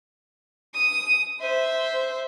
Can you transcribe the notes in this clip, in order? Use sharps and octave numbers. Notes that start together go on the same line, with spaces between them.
D#6
C5 E5